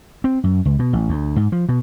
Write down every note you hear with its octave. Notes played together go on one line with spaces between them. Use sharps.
C4
F#2
C#2
B2
A1
D2
G#2
F3
B2